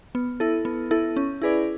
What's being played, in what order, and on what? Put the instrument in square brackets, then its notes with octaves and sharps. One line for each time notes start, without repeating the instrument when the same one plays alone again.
[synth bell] B3
E4 A4
B3
E4 A4
C#4
E4 G#4 B4 D5